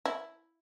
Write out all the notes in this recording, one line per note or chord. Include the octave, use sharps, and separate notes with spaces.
E4